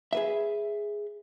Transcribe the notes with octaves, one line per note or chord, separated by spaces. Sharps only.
G#4 B4 E5